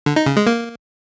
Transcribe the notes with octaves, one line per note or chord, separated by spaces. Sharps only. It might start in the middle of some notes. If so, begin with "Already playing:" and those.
D3
D#4
C#3
G#3
A#3